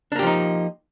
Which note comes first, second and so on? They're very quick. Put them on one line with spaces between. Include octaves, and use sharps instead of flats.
D4 A#3 G4 F3 D#4